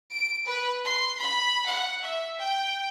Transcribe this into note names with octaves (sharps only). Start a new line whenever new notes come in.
D7
B4
C6
B5
F#5
E5
G5